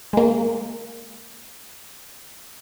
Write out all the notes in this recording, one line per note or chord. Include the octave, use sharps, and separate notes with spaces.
G#3 A#3